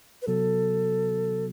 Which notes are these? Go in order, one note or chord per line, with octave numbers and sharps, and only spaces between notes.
B4
C3 F#3 B3 F#4 A4